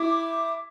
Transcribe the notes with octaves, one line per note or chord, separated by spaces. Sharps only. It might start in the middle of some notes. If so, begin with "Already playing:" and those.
Already playing: E4 D6